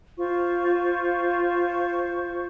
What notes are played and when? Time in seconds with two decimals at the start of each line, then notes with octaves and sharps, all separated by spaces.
0.18 F4 C5 C#6